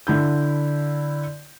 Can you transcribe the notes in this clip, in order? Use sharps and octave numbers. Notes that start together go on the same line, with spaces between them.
D3 E4 G6